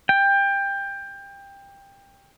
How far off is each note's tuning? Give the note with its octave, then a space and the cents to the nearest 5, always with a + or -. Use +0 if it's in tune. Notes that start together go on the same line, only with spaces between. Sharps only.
G5 +20